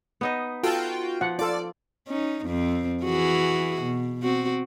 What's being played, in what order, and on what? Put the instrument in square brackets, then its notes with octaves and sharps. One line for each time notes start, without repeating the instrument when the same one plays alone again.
[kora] B3 D#4 D#5
[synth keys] F4 F#4 G5 [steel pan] A4 A5
[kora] F3 [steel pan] F#5
[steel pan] F4 A4 [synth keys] D5
[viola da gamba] C#4 D#4
F2 C4
E3 F#4 G#4
B2
C4 F#4